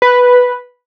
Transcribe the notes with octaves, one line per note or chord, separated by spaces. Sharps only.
B4